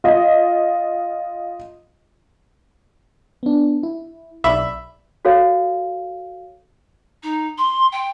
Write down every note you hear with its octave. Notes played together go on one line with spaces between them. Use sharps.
F4 D#5
B3 D4
E4
B1 D5 E5 B5
F#4 A4 C#5 F5
D#4
C6
G5